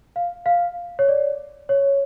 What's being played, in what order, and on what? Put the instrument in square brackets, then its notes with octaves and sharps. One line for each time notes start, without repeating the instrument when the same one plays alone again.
[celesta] F5
F5
C#5
D5
C#5